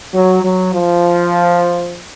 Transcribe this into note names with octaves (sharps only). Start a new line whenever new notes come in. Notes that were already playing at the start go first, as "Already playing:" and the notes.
F#3
F#3
F3